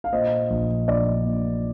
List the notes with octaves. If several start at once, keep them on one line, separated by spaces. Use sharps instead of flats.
F5
A#2 C5 D#5
A#1
A#1 D5
A#2